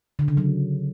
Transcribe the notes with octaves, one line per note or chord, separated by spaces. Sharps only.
D3
C#3
F#3